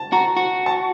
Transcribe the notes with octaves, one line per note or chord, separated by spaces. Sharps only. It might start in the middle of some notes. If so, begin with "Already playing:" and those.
Already playing: A5
F#4 A#5
F#4
A5